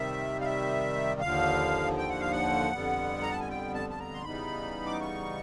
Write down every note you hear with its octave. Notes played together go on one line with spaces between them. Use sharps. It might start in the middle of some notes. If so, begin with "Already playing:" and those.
Already playing: C3 D#3 G3 E5
F5
E5
D#2 D3 F3 F5
G5
F#5
F5
F#5
F2 D3 G3 B3
A#5
A5
G#5
G5
A5
A5
A#5
C6
C#3 E3 G3 B3 D#4 B5
D6
C#6